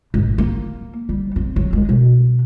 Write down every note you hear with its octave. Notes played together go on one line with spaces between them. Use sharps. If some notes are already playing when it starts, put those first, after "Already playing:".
G#1
A#3
G3
C4
F#3
G#3
B2